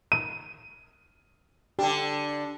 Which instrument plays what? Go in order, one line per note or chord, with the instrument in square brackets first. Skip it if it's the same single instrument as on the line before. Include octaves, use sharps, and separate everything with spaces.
[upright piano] D#7
[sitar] D3 D4 [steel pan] G4